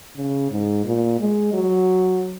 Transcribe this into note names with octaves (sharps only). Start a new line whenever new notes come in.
C#3
G#2
A#2
G#3
F#3